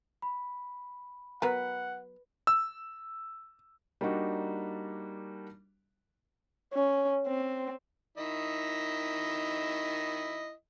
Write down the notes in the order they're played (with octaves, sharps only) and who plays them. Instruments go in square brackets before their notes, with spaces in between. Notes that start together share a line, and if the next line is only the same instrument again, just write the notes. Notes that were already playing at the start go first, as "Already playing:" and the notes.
[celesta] B5
[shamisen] F#3 B3 A#4 [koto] B4 [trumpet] F#5
[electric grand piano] E6
[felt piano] G3 A#3 D4 D#4 F#4
[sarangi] C#4
C4
[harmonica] D#3 E4 D#5